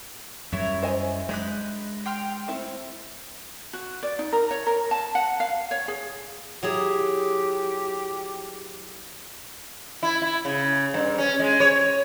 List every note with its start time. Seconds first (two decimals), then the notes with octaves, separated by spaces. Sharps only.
0.52 F#2 G3 E4 C#5
0.83 C5 D#5 G#5
1.29 G#3 D4 D#4 B5 F#6
2.06 G5 C6 F6
2.48 A3 C4 E4
3.73 F#4
4.03 D5
4.19 D#4
4.33 A#4
4.51 C#5
4.67 A#4
4.91 A5
5.15 F#5
5.40 F5
5.71 C#5
5.88 G#4
6.63 F#3 E4 G4 G#4
10.03 E4
10.22 E4
10.45 C#3
10.94 G2
11.18 C#4
11.40 G#3
11.60 C#5